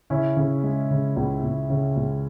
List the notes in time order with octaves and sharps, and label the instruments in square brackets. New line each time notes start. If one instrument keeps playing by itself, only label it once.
[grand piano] C#3 C#4 E4
C#3
G#3
C#3
C#2
C#2
C#3
C#2